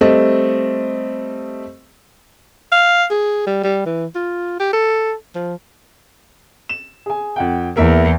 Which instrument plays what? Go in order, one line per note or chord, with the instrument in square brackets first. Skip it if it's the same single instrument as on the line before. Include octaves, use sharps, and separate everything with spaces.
[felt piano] G3 A3 C4 A4 D#5
[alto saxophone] F5
G#4
G3
G3
E3
F4
G4
A4
F3
[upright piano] E7
G#4 G#5
F2 F#5 G5
[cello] E2 [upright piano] A#3 A#4 E5